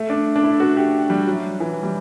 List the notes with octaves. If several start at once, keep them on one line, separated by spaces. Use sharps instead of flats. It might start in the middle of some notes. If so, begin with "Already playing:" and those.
Already playing: A3
D4
D4
E4
F#4
G4
G3
F#3
E3
G3